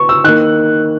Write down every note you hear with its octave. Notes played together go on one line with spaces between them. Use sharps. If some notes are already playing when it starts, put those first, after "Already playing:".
Already playing: B3 C#6
E6
D#3 A#3 F#6